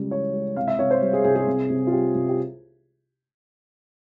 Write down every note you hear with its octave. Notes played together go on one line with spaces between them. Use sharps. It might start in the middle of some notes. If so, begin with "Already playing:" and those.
Already playing: C#2 G3 G#3
E3 C#5
G#3
C2 F5
E5
C2 C#5
C5
G3
G#4
C2 G#4
G#4
C3
C3
F4
G3 G4
C3
G4